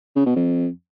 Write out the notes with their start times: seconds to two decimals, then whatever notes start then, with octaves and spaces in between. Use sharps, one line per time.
0.16 C#3
0.26 B2
0.36 F2